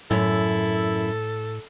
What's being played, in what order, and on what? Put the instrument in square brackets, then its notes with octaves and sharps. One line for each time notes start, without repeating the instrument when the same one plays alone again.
[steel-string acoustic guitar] F#2 [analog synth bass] A2 [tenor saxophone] E4 [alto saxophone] A4